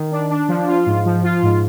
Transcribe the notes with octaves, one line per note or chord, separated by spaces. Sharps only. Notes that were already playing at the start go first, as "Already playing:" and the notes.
Already playing: D#3
D4
D4
F3
F4
G#2
F3
F4
G#2